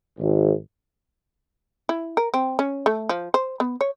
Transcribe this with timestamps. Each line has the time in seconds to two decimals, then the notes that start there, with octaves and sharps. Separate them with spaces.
0.19 G#1
1.89 E4
2.17 A#4
2.34 C4
2.59 C#4
2.86 A3
3.09 F3
3.34 C5
3.60 B3
3.81 C#5